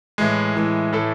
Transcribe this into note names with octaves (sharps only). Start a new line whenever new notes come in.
A2 E3 G#3
A2 E3 G#3
A2 E3 A3 E4 A4